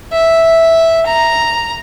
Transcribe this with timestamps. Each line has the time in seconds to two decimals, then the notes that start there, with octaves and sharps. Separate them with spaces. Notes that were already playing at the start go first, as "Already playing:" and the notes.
0.13 E5
1.06 A#5